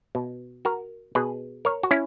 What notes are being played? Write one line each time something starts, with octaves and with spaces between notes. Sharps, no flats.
B2
F#4 A#4
B2 G#4 B4
A#4 C#5
F#4
C#4 E4